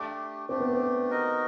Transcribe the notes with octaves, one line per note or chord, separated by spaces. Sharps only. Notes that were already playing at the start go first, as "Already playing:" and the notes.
Already playing: A3 D4 G4
A3 C4 D4 G4
B3
C4
D#4 F#4 A#4 D#5